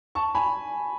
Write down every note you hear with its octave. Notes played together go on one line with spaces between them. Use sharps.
A5 C#6
G#5 B5